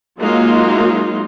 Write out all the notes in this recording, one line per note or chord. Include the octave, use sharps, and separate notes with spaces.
F#3 G#3 A#3 D#4 F4